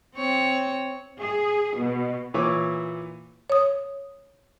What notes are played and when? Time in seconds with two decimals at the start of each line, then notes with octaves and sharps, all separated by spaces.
0.15 C4 C#5
1.19 G#4
1.77 B2
2.34 A#2 E3 C#5 D6
3.50 C#5 D#6